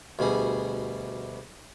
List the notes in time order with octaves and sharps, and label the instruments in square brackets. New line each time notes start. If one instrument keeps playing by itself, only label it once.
[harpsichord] D2 B2 G3 G#4